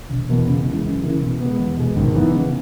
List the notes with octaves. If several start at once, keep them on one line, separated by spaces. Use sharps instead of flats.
E1
E2 B2 A#3
C#3
E3 G#3
F#2
C#3 E3 A#3
B2
G#3 B3
E2
B2 G#3
G#1
G#2 E3 B3
C#3